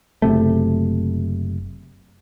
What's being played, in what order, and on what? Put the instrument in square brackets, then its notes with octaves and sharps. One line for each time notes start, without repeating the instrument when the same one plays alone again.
[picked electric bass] F#1 C3 A3